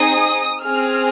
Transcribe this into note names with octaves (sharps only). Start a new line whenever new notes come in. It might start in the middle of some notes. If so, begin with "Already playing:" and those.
Already playing: C4 D#4 G#4 D#6
C4 G#4 F6